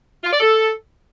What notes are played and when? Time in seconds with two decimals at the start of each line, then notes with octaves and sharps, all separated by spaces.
0.24 F4
0.32 D5
0.40 A4